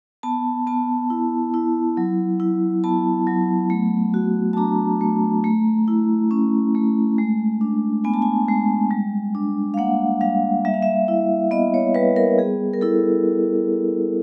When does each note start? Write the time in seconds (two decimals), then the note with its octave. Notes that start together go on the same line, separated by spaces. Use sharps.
0.23 B3 A5
0.67 B3 A5
1.10 E4
1.54 E4
1.97 F#3
2.40 E4
2.84 B3 A5
3.27 F#3
3.70 A3
4.14 F#4
4.53 A5
4.57 D4 A#5
5.01 A3
5.44 A3
5.88 E4
6.31 C#4
6.75 A3
7.18 G#3
7.61 D4
8.04 B3 G#5
8.14 A5
8.22 G#5
8.48 G#3
8.91 G3
9.35 D4
9.74 F5
9.77 A#3 F#5
10.21 G3 F5
10.65 G3 E5
10.74 F5
10.83 E5
11.08 E4
11.51 B3 D#5
11.74 C#5
11.95 G3 B4
12.16 A#4
12.38 G3 G#4
12.74 A#4
12.81 E4 A4